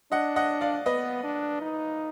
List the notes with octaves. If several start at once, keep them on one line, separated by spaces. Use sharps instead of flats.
D4 D#5 F#5
D#5 F#5
D5 F5
B3 B4 D#5
D4
D#4